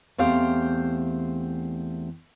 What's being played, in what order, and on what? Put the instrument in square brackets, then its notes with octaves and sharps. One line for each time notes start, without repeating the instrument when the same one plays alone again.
[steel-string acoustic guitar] E2 A3 C4 G4 C5 F5